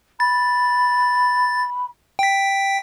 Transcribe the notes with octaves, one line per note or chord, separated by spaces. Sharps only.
B5 A6
G5 B6